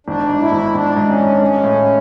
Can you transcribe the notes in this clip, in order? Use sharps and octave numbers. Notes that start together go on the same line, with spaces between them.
G#1 D4
G#2
E4
G#1
G#1 D4
G#2
C#4
G#1
D4
G#3 C#4
A2